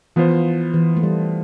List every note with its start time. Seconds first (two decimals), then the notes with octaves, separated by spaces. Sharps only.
0.16 E3 F3 B3 F4 C5
0.74 E3
0.97 A3
1.03 G3